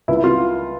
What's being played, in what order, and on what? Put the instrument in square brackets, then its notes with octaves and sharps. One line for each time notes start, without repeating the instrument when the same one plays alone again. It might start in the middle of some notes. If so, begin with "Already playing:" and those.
[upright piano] C#2 E4
F4